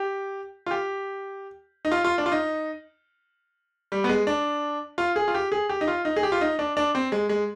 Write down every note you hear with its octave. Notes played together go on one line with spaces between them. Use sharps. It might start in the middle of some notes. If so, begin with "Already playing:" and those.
Already playing: G4
F4
G4
D#4
F4
F4
D4
F4
D#4
G3
B3
G#3
D4
F4
G#4
F4
G4
G#4
G4
D#4
F4
D#4
G#4
G4
F4
D#4
D4
D4
C4
G#3
G#3